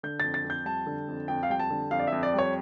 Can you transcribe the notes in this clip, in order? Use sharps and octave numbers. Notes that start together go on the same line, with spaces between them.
D3 G6
F2 A6
A6
F2
G6
G3 A5
D3
F2
F2 G5
F5
G3 G5
A5
D3
F2 F5
D5
E5
F2
D5
G3 C#5